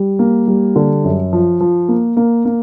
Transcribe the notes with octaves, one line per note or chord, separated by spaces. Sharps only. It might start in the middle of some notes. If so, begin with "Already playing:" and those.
Already playing: G3
A#3
G3
D3
F#2
F3
F3
A#3
A#3
A#3